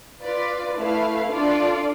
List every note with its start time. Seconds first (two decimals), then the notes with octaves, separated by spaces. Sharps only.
0.23 F4 B4 D5
0.78 A3 E4 B4 F5
1.32 D4 F4 A4 D5